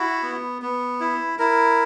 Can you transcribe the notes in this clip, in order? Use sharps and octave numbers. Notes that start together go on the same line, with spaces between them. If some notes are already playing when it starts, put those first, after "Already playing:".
Already playing: E4 F#4
B3
B3
E4
E4 A#4